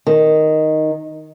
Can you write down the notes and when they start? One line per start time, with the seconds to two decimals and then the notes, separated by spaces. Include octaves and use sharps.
0.06 D#3